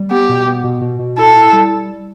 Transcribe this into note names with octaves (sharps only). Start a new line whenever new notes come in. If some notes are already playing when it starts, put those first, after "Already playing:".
Already playing: G3
B3 G4
B2
B3
B2
B2
B2
E4 A4
E4
G3